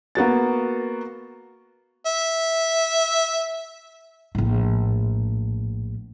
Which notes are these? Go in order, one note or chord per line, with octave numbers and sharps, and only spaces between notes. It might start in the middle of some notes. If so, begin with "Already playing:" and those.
A#3 B3 F#4 A6
E5
A#1 A2